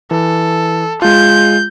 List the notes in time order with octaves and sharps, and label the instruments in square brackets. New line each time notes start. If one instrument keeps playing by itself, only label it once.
[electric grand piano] E3 [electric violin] A4
[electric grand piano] G#3 F4 [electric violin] G6